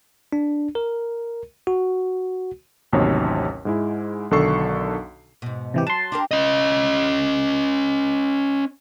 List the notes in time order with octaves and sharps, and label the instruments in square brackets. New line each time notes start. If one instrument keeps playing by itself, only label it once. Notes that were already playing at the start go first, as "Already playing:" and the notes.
[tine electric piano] D4
A#4
F#4
[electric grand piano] A1 D#2 C3 F#3 D#4 C#5
G#2 G#3 E4
B1 D3 D#3 A4 C#6 C7
[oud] G#2 B2
[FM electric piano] C3 E3 G4
[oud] F#3 [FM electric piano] A5 C6
[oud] D4 G4 A#4
[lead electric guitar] C#4 D#5